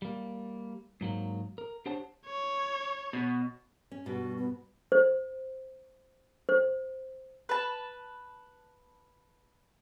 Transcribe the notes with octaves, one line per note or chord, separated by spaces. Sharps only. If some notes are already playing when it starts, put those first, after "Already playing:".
G3 A#3
G#2 F#3 A#3
A#4
D4 G4 C5 C#5 F#5 A5
C#5
B2
C#4
G2 B2 G3 F#4
B3
C5
C5
B4 A5